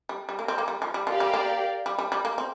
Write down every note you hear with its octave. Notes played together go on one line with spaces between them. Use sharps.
G3
G3
A#3
C4
A#3
G3
F3
G3
F3 G4 A#4 D5 F5
G3
A#3
G3
G3
G3
A#3
C4